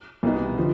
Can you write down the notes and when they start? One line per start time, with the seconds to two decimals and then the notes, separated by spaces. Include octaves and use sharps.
0.23 C2 B2 B3 D#4
0.58 D3 F3